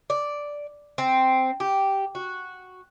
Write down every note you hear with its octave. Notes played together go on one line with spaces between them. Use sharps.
D5
C4
G4
F#4